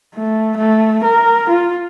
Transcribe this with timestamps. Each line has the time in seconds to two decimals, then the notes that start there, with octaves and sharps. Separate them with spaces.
0.15 A3
0.57 A3
1.04 A#4
1.49 F4